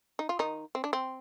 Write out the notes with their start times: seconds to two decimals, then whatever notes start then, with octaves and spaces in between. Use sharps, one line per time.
0.19 D#4
0.29 F4
0.39 D#3 D#4
0.75 C4
0.84 D4
0.93 C4